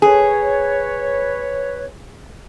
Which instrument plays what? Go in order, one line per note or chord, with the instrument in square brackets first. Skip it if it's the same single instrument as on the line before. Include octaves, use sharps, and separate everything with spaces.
[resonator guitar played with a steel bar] G#4 [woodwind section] B4 C#5